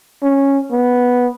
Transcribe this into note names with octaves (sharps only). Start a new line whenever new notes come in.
C#4
B3